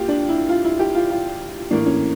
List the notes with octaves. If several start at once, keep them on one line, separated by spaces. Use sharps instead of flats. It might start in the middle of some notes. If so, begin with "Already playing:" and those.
Already playing: A#3 F4 G4
D4
E4
F4
E4
G4
F4
F4
A2 E3 A#3 D4
C#4